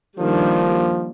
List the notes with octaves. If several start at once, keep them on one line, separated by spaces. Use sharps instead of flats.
D#3 F3 G3 A#3 D4